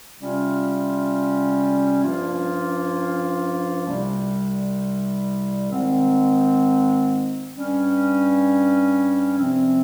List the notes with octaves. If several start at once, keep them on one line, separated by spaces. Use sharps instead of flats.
C3 G3 C#4 F4
G2 F3 A#3 C#4 F4
C2 C3 G3
G#2 D#3 G#3 C4
G2 G3 C#4
C3 F3 C4